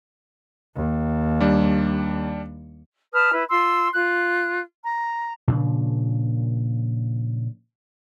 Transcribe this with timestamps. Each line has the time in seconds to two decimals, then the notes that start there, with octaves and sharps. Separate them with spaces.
0.76 D#2
1.40 G3 D4
3.13 B4 A5 D#6 F6
3.33 E4 B4
3.50 F4 C6 E6
3.92 F4 F#6
4.83 A#5
5.48 A#2 C#3 F3 D4